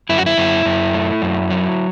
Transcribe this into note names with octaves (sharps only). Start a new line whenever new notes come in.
F#2 E4
F#4
E4
F#2
F#2
A3
F#2
F#3